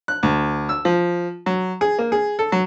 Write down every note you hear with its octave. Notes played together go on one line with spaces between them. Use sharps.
F#6
D2
E6
F3
F#3
G#4
A#3
G#4
A4
F#3